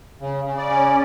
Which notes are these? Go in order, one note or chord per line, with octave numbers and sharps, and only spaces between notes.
C#3
C#3
D5
C#4